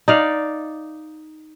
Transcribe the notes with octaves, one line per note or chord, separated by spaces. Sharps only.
D#4 D5 F5